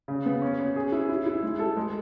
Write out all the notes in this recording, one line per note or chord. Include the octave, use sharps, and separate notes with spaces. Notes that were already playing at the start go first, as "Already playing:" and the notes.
C#3
B3
C#4
C#4
G#4
E4
E4
E4
G#3
A4
G#3